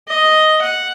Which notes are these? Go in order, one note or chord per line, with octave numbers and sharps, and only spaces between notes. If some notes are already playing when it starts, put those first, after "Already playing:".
D#5
F#5